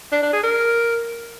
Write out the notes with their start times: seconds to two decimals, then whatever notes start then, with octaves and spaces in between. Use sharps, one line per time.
0.12 D4
0.22 D4
0.33 G#4
0.43 A#4